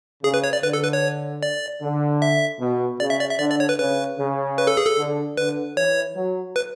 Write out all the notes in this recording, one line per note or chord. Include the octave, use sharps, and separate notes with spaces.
C#3 G#4
B4
C#5
D5
D3 B4
A4
B4
C#5
D5
D3
E5
B2
C#3 D5
E5
D5
E5
D3 D5
D5
C#5
B4
C#3 B4
C#3
B4
A4
G#4
A4
D3
D3 B4
E3 C#5
F#3
B4